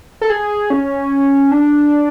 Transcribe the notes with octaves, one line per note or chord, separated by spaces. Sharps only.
A4
G#4
C#4
D4